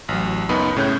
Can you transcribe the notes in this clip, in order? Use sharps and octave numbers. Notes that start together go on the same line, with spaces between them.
A1 F#3
C#2 F#2 B3 D#4 B5
A2 C#3 C#4 F#6 G6